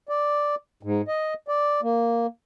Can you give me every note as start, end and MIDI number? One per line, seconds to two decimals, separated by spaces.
0.09 0.55 74
0.83 1.02 44
1.08 1.34 75
1.48 1.81 74
1.82 2.27 58